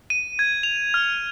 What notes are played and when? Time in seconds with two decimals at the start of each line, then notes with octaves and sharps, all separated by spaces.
0.10 D#7
0.39 G#6
0.63 F7
0.94 F6